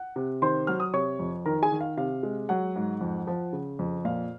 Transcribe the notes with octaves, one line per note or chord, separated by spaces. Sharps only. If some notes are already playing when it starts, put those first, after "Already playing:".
Already playing: F#5
C3
D#3 C5 C6
F#3 F6
D#6
C3 C#5 C#6
F2
D#3 A#4 A#5
G#4 G#5
D#3
F5
C3 F5
G#3
F#3 F#5
G#2
F2
F3
C#3
F2
A#2 F5